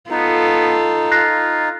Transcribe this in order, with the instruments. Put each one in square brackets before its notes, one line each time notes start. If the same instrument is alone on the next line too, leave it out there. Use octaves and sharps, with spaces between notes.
[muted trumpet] B3 [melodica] D#4 [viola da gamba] F4 A4
[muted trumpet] F4 [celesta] F#6 A#6 C7